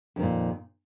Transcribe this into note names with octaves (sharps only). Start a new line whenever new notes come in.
F2 A#2 D#3